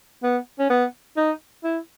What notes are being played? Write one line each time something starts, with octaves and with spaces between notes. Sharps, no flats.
B3
C#4
B3
D#4
E4